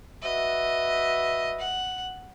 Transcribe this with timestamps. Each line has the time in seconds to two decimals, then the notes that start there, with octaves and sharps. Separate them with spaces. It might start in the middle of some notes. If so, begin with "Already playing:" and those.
0.23 F#4 B4 D#5 E5
1.60 F#5